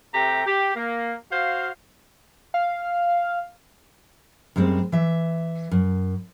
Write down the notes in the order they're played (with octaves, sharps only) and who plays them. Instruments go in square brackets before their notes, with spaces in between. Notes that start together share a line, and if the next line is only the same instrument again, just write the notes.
[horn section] C3 A3 G4 G5 A#5
G4
A#3
F#4 C5 F5
[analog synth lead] F5
[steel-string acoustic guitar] F#2 G3 G#3 C4
E3 E5
F#2